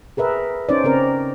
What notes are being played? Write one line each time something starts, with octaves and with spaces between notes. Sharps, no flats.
G#4 A#4 B4 E5
C#4 D#4 C5 D5
C#3 C4 C#4 A#4